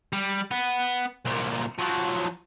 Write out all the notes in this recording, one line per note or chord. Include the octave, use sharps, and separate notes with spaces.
G3
B3
C2 A#2
F3 F#3